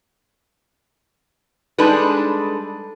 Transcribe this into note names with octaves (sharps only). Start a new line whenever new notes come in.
G3 G#3 D4 D#4 A4 B4